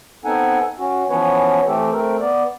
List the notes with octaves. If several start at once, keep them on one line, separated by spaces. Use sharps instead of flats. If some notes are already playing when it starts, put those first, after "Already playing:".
B3 C4 D#4 A4 F#5 G#5
C#4 F#4
E3 F3 B3 C#4 B4 C#5
E3 A3 C4 G4 A4
A3 C4 A#4
B3 D5